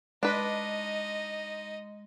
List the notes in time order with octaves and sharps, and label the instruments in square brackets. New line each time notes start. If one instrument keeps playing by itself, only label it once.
[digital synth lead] G#3 [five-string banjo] D4 B4 [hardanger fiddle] D#4 D#5